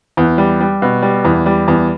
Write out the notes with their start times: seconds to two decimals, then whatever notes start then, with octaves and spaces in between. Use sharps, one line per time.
0.17 E2
0.38 G3
0.60 G3
0.82 B2
1.02 G3
1.25 E2
1.46 G3
1.68 E2